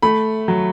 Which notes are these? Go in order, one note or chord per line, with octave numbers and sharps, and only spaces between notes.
A3 B5
F#3